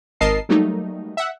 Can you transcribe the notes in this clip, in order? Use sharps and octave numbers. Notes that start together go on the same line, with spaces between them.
G#1 A#4 D#5 A5 C7
F#3 G3 A3 A#3 D#4
E5 F#5